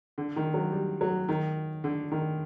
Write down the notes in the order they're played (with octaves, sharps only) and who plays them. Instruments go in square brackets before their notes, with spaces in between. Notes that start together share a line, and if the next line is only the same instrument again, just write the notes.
[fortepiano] D3
D#3
F#3
G3
F#3
D#3
D3
D#3